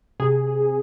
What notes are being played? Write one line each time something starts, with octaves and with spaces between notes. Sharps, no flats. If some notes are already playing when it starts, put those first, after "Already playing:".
C3 G#4